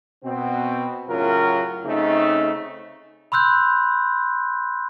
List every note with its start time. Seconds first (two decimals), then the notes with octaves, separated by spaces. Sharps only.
0.24 B2 C4
1.09 F#2 A2 C#3 F#3 F4 A#4
1.85 C#3 A3 C4 D#4
3.32 B5 C6 E6 F#6 G6